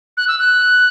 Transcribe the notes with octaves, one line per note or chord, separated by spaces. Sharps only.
F#6
E6
F#6